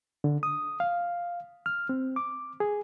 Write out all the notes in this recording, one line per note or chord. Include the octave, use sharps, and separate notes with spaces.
D3
D#6
F5
F6
C4
D6
G#4